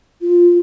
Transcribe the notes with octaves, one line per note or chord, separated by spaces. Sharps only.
F4